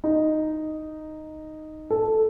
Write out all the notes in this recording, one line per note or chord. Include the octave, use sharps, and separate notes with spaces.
D#4
A4